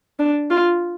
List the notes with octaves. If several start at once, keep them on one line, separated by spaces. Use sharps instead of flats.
D4
F4